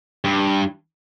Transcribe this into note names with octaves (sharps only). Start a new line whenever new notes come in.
G2